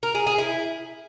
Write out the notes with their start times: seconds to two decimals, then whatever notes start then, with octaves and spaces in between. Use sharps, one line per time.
0.03 A#4
0.15 G#4
0.26 G#4
0.38 E4